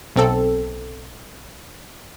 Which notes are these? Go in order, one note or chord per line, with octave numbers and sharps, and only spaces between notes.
B1 C4 A4